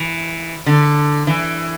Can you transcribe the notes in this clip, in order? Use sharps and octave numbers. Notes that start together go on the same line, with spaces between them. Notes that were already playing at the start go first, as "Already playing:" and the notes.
Already playing: E3
D3
E3